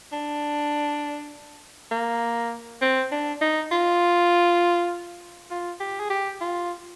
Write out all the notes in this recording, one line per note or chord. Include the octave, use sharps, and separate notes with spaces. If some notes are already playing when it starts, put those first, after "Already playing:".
D4
A#3
C4
D4
D#4
F4
F4
G4
G#4
G4
F4